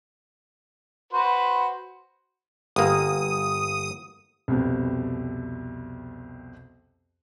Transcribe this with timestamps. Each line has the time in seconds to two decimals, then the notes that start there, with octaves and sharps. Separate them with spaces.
1.13 F#4 B4 C5
2.76 G1 A#3 D#6
4.48 C2 F2 B2